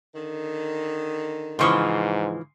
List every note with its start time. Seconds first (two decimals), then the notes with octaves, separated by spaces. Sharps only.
0.14 D3 D#3
1.59 G#2 C#3 E3 F3 C6 C#6 D#6